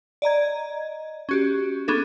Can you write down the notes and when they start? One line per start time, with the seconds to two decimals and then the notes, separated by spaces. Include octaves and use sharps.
0.22 D5 D#5 A#5 G#6
1.29 C#4 F#4 G4
1.88 B3 C#4 D4 G#4 A4